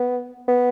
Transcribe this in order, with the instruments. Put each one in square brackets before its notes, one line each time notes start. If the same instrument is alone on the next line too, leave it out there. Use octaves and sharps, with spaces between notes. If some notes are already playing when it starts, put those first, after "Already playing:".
Already playing: [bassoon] B3
B3